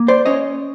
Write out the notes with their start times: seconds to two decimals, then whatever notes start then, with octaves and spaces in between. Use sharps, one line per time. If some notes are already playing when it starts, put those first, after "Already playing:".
Already playing: A#3
0.08 C5 D5
0.26 C#4 C#5 D#5